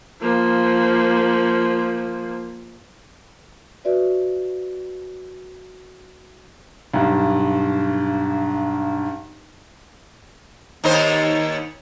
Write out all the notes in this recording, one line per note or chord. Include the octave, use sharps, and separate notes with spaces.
F3 A#3
F#4 B4 D5 E5
B1 G2
D#2 D#4 C5